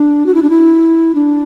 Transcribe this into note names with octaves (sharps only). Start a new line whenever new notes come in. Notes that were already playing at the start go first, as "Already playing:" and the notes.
Already playing: D4
F#4
E4
D4
E4
D4